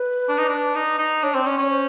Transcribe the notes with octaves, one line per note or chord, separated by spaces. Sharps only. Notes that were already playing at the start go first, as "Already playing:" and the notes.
Already playing: B4
D4
D#4
D4
D#4
D#4
D4 C#5
C4 C5
C#4 D5
C#4 C#5
C5